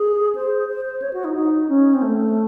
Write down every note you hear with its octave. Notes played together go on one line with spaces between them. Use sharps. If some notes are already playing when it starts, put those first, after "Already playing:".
Already playing: G#4
C5
C5
C5
C#5
F#4
D#4
D#4
C#4
C4
A3